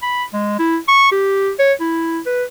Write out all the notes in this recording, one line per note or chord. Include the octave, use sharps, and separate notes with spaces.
B5
G#3
E4
C#6
G4
C#5
E4
B4